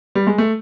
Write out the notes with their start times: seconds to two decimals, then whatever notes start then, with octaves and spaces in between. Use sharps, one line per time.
0.15 G3
0.27 G#3
0.38 A3